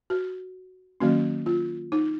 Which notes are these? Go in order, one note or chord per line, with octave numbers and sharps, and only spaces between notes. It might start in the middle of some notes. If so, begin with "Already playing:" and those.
F#4
D#3 F#3 A#3 C#4 F#4
F4
D#4